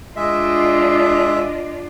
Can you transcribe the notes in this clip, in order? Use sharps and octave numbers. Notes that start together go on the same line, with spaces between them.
G#3 D4 F4 D#5 E5